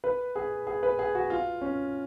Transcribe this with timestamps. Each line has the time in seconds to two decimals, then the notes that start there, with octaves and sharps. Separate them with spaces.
0.04 B4
0.36 G#4
0.67 G#4
0.83 B4
0.99 G#4
1.15 F#4
1.30 F4
1.61 C#4